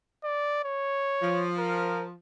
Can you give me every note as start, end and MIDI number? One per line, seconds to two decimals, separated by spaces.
0.24 0.64 74
0.64 1.45 73
1.21 2.14 53
1.58 2.05 70